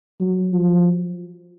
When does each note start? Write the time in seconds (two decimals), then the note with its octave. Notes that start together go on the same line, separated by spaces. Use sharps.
0.20 F#3
0.53 F3